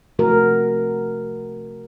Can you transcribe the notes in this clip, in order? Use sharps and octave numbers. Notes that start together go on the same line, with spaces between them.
C3 F3 A3 F#4 A#4